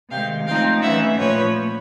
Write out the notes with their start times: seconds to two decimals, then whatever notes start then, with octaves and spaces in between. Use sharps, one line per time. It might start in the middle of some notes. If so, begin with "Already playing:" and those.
0.11 C3 D#3 G#3 F5 G5
0.46 F3 A3 C4 D#4 F5 G5
0.82 E3 A3 C#4 E5 F#5
1.18 A#2 F3 A3 B4 C#5